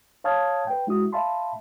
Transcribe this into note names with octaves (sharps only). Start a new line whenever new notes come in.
C#5 F5 A5 D#6 F6 G#6
B4 G5
G#3 E4 F#4 D#6
E5 F5 A5 B5 C6